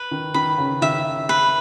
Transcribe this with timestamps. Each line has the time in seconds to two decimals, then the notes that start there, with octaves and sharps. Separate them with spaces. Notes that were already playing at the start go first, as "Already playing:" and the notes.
Already playing: B4
0.11 D#3
0.34 D#3 B5
0.58 C#3
0.81 D#3 E5
1.29 B4